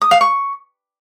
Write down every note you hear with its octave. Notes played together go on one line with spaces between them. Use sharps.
D#6
F5
C#6